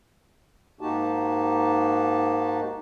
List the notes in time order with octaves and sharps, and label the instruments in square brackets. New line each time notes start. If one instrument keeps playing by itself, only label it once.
[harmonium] G#2 A#3 D#4 F#4 G4 A5